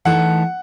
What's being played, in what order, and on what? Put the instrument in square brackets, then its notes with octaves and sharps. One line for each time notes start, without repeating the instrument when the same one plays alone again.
[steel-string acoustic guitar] E3 A3 D#4 A4 [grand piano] F#5